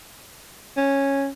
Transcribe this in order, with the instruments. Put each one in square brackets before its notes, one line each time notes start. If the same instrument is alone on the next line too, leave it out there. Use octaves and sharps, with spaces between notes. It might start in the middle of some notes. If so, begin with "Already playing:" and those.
[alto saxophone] C#4